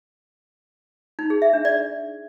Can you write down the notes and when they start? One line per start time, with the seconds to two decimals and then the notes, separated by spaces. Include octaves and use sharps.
1.19 D#4
1.30 G#4
1.42 E5
1.53 D4
1.65 D5